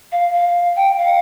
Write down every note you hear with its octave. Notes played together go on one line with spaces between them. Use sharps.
F5
F5
G5
F5